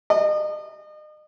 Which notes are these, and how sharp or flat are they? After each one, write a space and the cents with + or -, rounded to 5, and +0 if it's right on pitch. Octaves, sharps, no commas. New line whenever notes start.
D#5 -35